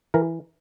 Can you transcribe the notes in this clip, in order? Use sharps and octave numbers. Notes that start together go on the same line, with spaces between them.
E3 A#4